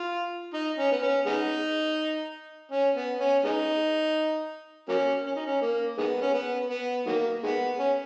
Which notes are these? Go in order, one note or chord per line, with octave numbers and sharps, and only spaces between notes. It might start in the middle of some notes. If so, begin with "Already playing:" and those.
Already playing: F4
D#4
C#4
B3
C#4
G#3 B3 D#4
C#4
B3
C#4
G#3 B3 D#4
F#3 A#3 C#4
C#4
D#4
C#4
A#3
D#3 G#3 B3
C#4
B3
B3
D#3 F#3 A#3
D#3 G#3 B3
C#4